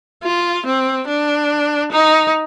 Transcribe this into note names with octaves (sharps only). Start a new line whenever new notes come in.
F4
C4
D4
D#4